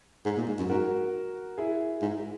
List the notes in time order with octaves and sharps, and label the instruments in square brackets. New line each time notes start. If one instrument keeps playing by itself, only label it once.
[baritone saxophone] G#2
A#2
G#2
F#2
[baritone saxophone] G#2 [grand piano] F#4 A#4
[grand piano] E4 G#4
[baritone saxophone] G#2